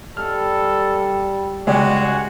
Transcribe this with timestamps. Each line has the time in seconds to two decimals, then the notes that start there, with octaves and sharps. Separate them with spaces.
0.17 G3 A4 F6
1.67 C#2 G#3 F#4 G4 D5